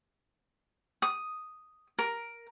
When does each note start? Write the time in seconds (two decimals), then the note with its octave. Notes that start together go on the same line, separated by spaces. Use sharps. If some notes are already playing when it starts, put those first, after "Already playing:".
1.02 D#6
1.99 A#4